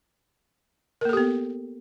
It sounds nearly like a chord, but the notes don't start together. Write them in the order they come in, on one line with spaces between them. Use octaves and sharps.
A#4 A#3 A4 G4 B3